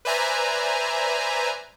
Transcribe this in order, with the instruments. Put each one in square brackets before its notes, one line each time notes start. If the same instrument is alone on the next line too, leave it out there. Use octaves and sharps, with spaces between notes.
[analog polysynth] B4 C5 D5 E5 G#5 A#5